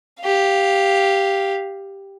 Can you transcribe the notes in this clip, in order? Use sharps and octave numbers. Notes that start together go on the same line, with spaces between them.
G4 F5